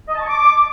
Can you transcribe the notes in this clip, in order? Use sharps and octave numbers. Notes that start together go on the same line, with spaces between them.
D#5
A5
C#6
D6